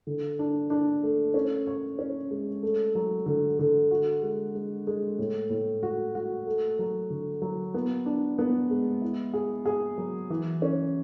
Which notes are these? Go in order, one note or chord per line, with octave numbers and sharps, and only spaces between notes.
D3
D4
D4
A3
C#4
C#5
C#4
G#3
A3
F#3
D3
D3
F#4
G#3
G#3
G#3
A2
A2
F#4
F#4
A3
F#3
D3
F#3
B3
D4
B3
G#3
E4
G#4
G#4
F#3
E3
C#4